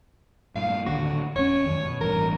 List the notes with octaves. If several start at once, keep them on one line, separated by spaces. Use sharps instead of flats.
G2 A#2 F5
D1 D#2 D3 F#4
E1 C#4 C#5
F#2 D#3
B2
A1 G2 A#4